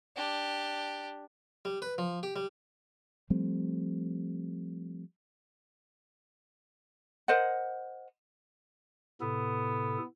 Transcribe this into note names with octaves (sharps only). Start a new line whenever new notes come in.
D4 G4
G3
B4
F3
G4
G3
F3 G3 A3 C4
A#4 C5 D#5 F#5
A2 C3 B3 A4